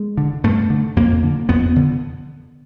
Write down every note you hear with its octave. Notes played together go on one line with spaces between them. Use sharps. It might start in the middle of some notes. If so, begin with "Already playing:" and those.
Already playing: G#3
D3
G2 A3
D3
F2 A#3
D3
F2 B3
D3